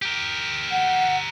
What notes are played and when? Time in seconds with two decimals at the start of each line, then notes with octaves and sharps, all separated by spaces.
0.02 G4 A#4
0.71 F#5